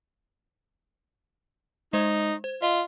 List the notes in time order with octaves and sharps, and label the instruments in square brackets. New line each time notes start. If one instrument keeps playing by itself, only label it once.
[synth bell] G#3 C5 [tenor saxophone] D#4
[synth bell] C5
[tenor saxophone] F4 [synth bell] D#5